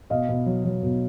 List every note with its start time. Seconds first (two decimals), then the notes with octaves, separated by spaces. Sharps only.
0.10 B2 D#5 F5
0.29 B2
0.46 F#3
0.64 F#3
0.83 B2